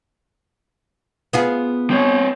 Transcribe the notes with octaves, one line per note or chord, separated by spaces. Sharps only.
B3 F4 G#4
C4 C#5